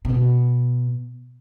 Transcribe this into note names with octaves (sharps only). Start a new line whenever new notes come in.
C3
B2